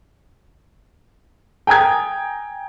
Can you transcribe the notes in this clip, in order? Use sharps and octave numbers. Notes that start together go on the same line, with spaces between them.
G5 G#5 A#5 D#6 G#6